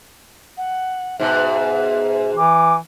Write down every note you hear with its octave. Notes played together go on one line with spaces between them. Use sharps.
F#5
G#2 B2 E5
E3 D6